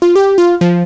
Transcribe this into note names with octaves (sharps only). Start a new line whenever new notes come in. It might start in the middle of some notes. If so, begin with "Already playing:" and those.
F4
G4
F4
F3